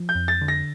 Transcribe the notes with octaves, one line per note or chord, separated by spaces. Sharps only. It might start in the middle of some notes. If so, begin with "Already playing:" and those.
Already playing: F3
G6
F2
A6
D3
A#6